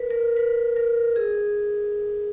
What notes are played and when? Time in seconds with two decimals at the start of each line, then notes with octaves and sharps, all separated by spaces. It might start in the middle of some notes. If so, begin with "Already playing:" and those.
Already playing: A#4 B4
0.11 A#4
0.37 B4
0.76 A#4
1.16 G#4